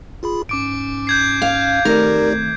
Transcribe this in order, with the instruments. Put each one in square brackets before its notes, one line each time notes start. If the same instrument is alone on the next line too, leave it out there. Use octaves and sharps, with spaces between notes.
[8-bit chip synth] F4 G#4 B5
[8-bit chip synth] G#2 C#4 [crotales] D6 D7
[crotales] G6 G#6 C7
[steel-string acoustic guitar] F5
[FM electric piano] D#3 A3 C4 [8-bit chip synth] D#4 G4 D5 [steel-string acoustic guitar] A#4